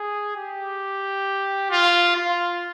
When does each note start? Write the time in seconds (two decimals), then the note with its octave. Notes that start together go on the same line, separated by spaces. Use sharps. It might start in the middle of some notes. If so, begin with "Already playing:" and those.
Already playing: G#4
0.36 G4
1.71 F4
2.16 F4